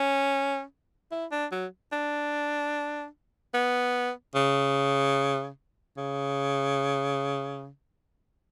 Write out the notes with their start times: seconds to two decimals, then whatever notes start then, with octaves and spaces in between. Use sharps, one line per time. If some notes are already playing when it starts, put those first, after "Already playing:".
Already playing: C#4
1.11 E4
1.31 D4
1.52 F#3
1.92 D4
3.54 B3
4.35 C#3
5.97 C#3